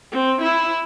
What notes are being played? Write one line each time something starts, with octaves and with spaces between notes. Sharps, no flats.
C4
E4